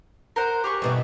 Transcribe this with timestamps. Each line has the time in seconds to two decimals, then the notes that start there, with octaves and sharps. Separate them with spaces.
0.36 A#4 C5 F#5
0.64 G4 G#4 C#6
0.82 G2 B2 E3